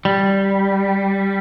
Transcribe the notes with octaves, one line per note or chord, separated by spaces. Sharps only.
G3